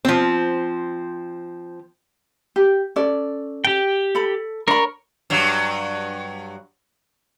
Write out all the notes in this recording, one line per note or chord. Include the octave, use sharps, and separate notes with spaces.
F3 C4
G4
C#4 A4 D5
G4 G5
A4 B5
D4 A#4 C#5 B5
G2 F#3